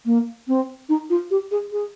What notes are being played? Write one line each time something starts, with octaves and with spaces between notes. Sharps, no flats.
A#3
C4
D#4
F4
G4
G#4
G#4